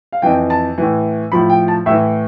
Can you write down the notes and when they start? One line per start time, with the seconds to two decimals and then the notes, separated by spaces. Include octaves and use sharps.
0.12 F5
0.22 F2 E3 G5
0.50 A5
0.78 A2 E3
1.32 A2 F3 B5
1.49 G5
1.68 A5
1.86 A2 E5
1.90 E3